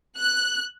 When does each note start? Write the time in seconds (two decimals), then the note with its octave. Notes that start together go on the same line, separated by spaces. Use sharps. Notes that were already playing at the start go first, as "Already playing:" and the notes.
0.18 F#6